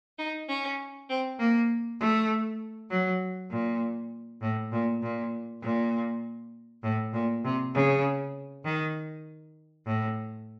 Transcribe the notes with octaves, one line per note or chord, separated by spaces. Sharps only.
D#4
C#4
C4
A#3
A3
F#3
A#2
A2
A#2
A#2
A#2
A2
A#2
C3
C#3
D#3
A2